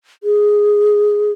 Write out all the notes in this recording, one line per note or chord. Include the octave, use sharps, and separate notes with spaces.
G#4